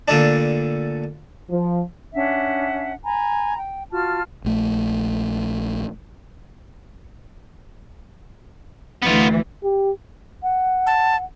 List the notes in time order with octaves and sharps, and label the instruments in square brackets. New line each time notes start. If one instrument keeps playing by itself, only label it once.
[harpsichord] A#2 D3 A3 D4
[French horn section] F3
[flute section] C#4 D4 E5 F#5
G#5 A#5 B5
G5
F4 F#4 A5 F6
[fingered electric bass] A#1 A3
[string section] D2 E3 [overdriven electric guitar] B3 F4
[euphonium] G4
[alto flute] F#5
[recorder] A5